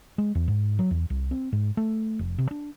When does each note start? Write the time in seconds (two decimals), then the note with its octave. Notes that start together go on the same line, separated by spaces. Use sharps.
0.18 G#3
0.35 E2
0.48 G#2
0.79 F#3
0.91 E2
1.10 C2
1.31 C4
1.52 G#2
1.77 A3
2.19 F1
2.38 C3
2.51 D4